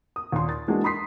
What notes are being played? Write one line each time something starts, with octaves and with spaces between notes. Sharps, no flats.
D#6
D#2 A#2 C6
A6
E3 G#3 A#3 D4 F#4 G#4
B5 C6 D#6 B6 C7